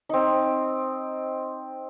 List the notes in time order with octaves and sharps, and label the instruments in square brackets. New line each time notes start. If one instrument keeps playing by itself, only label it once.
[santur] C4 D#4